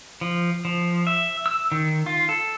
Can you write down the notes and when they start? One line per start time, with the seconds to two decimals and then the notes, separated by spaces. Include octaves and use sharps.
0.21 F3
0.65 F3
1.07 E5
1.46 E6
1.72 D#3
2.06 F4
2.29 A4